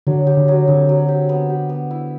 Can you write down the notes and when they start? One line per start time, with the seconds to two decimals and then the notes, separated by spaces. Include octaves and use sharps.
0.07 D3 F#3
0.27 G4
0.37 D3
0.48 F#3
0.68 D3 C4
0.89 F#3
1.08 G4
1.29 B3
1.50 G4
1.69 B3
1.91 E4